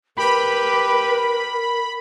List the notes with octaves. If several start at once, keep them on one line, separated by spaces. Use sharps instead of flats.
G4 A#4 B4 B5